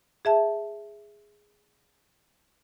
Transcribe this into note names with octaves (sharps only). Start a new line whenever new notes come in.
G#4 E5 A5